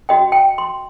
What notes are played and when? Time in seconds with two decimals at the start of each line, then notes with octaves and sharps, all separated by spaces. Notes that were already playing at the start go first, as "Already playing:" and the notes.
0.09 F#4 D#5 G5
0.32 G5
0.58 C6